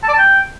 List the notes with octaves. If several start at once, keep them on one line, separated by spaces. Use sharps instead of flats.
A5
D5
A5
G5